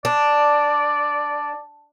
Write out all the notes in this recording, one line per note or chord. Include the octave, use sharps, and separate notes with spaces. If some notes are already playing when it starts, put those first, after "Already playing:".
D4 D5